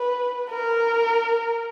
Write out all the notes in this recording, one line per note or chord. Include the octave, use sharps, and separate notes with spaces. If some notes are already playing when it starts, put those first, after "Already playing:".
Already playing: B4
A#4